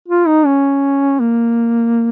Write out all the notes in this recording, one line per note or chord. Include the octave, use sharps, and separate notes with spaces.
F4
D#4
C#4
A#3